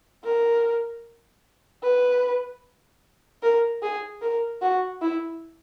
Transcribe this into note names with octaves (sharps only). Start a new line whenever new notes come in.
A#4
B4
A#4
G#4
A#4
F#4
E4